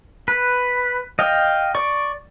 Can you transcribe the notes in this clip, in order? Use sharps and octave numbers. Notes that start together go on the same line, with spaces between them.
B4
D#5 F5 G5
D5 C#6